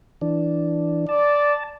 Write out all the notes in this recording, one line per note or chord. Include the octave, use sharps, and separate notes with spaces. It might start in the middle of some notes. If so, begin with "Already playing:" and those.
E3 D4
D5 A5